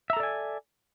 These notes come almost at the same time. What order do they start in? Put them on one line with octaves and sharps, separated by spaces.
E5 A#5 A4 D5 G#5